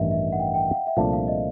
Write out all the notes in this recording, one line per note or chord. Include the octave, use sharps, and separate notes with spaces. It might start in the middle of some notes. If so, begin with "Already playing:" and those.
Already playing: A1 G2 D#3 D#5 E5
E5
F#5
G5
F#5
G5
F5
F#5
E5
C2 A#2 F3 A3 D4 F5
F5
D#5